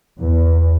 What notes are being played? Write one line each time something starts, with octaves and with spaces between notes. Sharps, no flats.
E2